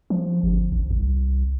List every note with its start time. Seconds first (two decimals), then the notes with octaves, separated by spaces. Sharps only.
0.10 F3
0.43 G1
0.72 A1
0.91 C2